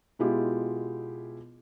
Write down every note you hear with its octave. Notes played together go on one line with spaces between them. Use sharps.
B2 G#3 E4 F4 G4